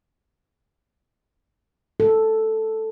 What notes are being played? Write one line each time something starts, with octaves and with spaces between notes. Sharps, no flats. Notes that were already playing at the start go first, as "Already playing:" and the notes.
A4